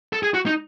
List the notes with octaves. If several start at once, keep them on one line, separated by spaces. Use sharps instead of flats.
A4
G#4
F#4
D#4